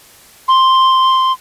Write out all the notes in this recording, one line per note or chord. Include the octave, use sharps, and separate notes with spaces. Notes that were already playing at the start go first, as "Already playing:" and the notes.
C6